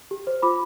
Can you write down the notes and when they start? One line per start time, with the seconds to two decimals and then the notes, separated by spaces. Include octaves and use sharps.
0.11 G4
0.27 C5
0.42 F4 B5 D6